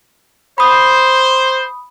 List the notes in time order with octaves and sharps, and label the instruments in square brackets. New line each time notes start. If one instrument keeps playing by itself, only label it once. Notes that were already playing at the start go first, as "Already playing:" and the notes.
[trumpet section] C5 [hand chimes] B5 D#6